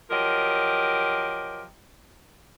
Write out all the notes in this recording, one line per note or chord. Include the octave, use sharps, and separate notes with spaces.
F3 F#3 G4 A#4 D#5